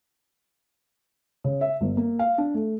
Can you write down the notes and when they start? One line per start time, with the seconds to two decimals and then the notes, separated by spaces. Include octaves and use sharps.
1.44 C#3
1.61 E5
1.81 G1
1.97 A#3
2.19 F5
2.38 D4
2.54 A3